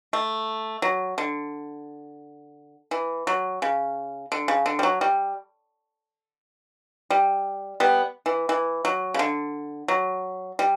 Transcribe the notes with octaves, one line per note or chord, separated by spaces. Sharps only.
A3
F#3
D3
E3
F#3
C#3
D3
C#3
D3
G3
F#3
G3
G3
G3 B3
E3
E3
F#3
C#3
D3
F#3
G3